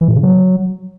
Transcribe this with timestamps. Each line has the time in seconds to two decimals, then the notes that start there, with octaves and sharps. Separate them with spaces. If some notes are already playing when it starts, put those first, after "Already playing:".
0.01 E3
0.08 A2
0.16 C#3
0.23 F#3